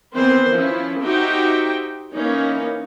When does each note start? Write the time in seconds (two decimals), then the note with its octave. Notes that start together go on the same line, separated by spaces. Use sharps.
0.13 D#3 E3 B3 C4 B4 C5
0.53 F3 C#4 E4
1.03 D#4 F#4 G4 C5 E5 G5
2.13 E3 A#3 C#4 D#4